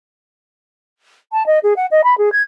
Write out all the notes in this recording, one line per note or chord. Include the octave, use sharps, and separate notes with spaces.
A5
D#5
G#4
F#5
D#5
B5
G#4
G#6